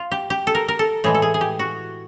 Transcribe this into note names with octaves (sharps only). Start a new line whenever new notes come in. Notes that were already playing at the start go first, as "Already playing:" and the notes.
Already playing: F4
G4
G4
A4
A#4
A#4
A4
A2 E3 G#3 G#4
A4
G#4
G#4
G4
F#4